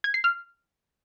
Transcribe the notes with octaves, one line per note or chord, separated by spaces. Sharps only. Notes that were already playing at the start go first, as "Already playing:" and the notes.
G#6
C7
F6